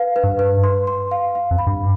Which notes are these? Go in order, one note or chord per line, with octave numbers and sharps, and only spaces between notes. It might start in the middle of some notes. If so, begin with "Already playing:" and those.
Already playing: B4 F5
B4
G2
B4
C6
C6
F5
F5
F2
B5
G2